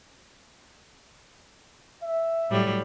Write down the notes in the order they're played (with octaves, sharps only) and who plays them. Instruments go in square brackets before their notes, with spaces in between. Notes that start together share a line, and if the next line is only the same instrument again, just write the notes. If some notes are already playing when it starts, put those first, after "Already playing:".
[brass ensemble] E5
[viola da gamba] A2 F#3 G3